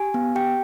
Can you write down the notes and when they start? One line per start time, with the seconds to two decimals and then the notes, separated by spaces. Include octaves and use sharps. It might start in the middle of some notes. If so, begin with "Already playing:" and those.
Already playing: G4 G#5
0.14 B3
0.35 G4 G5